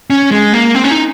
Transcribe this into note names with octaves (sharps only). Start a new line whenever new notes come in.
C#4
G#3
A#3
C4
C#4
D#4